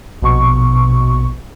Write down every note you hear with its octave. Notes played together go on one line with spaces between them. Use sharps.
A#1 B2 C#6